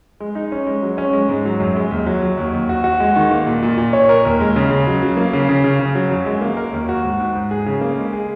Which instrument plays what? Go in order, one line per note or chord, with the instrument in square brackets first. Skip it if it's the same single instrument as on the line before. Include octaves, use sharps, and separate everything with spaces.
[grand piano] G#3
D#4
C#4
G#3
F#3
C#4
G#3
G#2
F#3
F#2
G#3
D#2
F#3
F#3
D#2
D#2
F#4
F#4
G#3
D#3
A#3
A#2
A#2
A#2
C#5
A#4
D#2
G#3
C#3
C#3
F#3
F#3
A#3
C#3
C#3
C#3
C#3
F#3
F#2
G#3
A#3
A#4
D#2
F#4
G#2
G#2
G#2
G#4
C#3
A#3
G#3
G#4